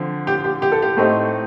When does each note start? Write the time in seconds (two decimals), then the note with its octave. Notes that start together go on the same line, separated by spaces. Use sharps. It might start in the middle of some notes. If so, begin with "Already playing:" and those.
Already playing: D3 F3 C4
0.27 G4
0.44 G4
0.62 G4
0.72 A4
0.82 G4
0.97 A2 A3 C4 D#4